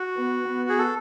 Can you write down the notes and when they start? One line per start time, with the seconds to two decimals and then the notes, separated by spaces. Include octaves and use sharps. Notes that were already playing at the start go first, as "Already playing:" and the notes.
Already playing: F#4
0.16 B3
0.48 B3
0.69 G#4
0.78 A4